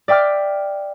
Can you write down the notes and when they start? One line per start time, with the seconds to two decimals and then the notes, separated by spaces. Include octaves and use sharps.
0.08 D5 E5 G5 D6 F6